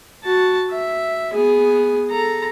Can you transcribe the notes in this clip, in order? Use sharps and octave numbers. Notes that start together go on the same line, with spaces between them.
F#4 A5
E5
B3 G#4
A4 A#5